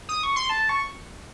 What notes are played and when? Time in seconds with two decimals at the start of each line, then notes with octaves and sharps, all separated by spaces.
0.09 D#6
0.23 C#6
0.36 C6
0.50 A5
0.69 C#6